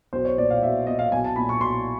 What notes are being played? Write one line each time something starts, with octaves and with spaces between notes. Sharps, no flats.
B1 C5
C#5
A#2 D5
F5
B1 E5
A#2 D#5
F5
B1 G#5
A5
A#2 B5
C#6
B1 C6